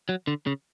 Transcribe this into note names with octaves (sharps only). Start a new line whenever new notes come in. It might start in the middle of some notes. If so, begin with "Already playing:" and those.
F#3
D3
C#3